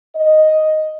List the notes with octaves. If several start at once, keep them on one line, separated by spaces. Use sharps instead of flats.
D#5